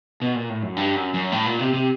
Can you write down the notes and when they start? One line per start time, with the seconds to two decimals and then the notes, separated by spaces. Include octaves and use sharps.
0.21 B2
0.35 A#2
0.49 A2
0.63 F#2
0.77 G2
0.96 F#2
1.14 F#2
1.32 A2
1.46 A#2
1.59 C3
1.73 C3